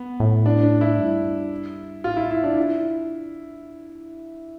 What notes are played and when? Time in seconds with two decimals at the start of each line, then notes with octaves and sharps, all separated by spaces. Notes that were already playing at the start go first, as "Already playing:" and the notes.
Already playing: B3
0.20 A2
0.46 D4
0.63 D4
0.81 E4
0.99 G2
2.04 A2 F4
2.17 E4
2.31 E4
2.43 D4
2.57 C3 E4